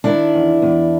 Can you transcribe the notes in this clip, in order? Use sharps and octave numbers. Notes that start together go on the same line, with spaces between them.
D#3 D4 E4
E2
E2